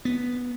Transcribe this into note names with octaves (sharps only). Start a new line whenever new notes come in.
B3